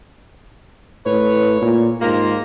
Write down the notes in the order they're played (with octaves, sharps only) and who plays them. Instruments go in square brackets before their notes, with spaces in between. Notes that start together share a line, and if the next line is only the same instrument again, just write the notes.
[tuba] A2 [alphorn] B4 [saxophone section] C#5
[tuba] A#2
[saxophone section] D#2 A#3 [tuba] G#2 [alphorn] F4